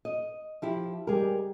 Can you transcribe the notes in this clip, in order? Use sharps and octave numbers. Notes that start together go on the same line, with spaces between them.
D#5
F3 E4 G4
G3 G#3 G4 G#4 A#4